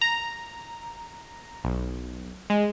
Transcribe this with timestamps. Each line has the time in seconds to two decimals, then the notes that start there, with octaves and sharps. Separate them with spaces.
0.01 A#5
1.64 B1
2.50 G#3